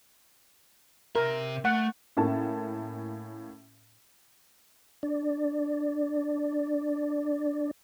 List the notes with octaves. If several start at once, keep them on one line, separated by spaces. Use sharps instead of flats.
C3 A#4 E5
A3 F#5
A2 A#3 C#4 A5
D4 D5